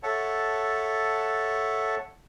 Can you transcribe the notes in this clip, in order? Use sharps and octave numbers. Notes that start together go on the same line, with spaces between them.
A4 C#5 E5 F#5 A5